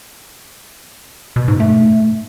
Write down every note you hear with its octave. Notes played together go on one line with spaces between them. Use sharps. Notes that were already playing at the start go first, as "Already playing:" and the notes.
B2
G#2
A3